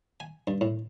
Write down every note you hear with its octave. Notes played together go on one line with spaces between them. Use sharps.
G#5
G2
A2